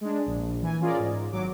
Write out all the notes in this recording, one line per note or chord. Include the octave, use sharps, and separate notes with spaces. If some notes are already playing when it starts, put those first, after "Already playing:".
G#3 D4
A#1
E3 G#5
C#4 F4 G#4 A#4 D5
G#2
G#1 F#3 D6